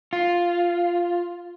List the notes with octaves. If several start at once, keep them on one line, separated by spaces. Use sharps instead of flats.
F4